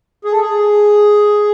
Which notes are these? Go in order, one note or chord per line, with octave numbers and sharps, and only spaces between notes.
G#4
A4
G#4